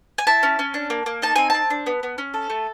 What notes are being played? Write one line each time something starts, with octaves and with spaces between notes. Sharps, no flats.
G#5
E4 A5
C#4
C#4
D4
A#3
A#3
D#4 A5
C4 G#5
C4 A5
D4
B3
B3
C#4
A4
A3